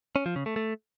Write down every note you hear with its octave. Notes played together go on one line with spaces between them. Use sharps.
C#4
F3
C#3
A3
A3